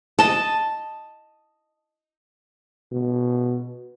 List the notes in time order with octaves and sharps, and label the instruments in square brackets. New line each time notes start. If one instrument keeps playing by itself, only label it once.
[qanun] D#5 A5
[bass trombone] B2